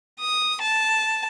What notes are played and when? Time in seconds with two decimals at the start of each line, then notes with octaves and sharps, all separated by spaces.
0.20 D#6
0.61 A5